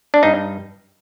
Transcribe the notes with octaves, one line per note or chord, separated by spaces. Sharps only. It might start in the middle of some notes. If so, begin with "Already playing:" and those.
D4
G2 D#4